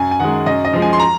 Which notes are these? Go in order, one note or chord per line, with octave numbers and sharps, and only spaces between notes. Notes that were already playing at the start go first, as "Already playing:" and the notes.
Already playing: F#2 G#5
G#5
D#3 G#3 F#5
F#2 D#5
D#5
F3 G#3
G#5
C6
A#5